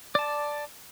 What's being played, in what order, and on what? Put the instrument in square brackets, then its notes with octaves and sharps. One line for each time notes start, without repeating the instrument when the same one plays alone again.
[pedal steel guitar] D5 A5